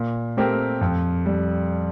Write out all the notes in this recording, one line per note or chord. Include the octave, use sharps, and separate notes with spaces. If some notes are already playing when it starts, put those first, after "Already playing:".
Already playing: A#2
A3 C4 G4 A#4
F2
G3